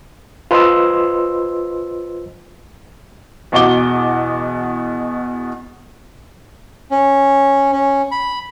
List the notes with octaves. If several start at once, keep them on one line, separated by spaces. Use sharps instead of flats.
F4 B4 C5 D#5 C6 E6
E2 B2 F#4 D#5 D6 G7
C#4
C#4
B5